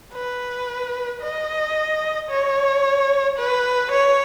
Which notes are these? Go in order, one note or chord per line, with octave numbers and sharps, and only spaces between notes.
B4
D#5
C#5
B4
C#5